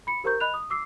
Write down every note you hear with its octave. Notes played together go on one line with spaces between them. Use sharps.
B5 C#7
G4 A#4 C5 A#5 C#6 G6
D#5 B5 F#6 F7
D#6
D6 E6 C7